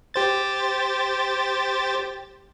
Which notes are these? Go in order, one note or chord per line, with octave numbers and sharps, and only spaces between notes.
G4 C5 A6